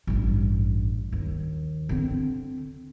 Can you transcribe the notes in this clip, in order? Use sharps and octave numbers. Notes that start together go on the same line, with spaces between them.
A1 G2
D#2
D3 C4